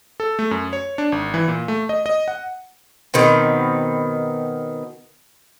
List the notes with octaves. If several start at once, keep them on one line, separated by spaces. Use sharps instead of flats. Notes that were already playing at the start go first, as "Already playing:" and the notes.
A4
A3
F#2
C#5
D4
G#1
E3
A#2
A3
D#5
D#5
F#5
B2 D#3 B3 C4